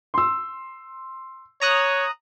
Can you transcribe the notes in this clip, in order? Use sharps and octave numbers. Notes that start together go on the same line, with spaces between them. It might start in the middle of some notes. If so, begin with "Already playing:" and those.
C6 E6
C#5 A#5 D#6 F#6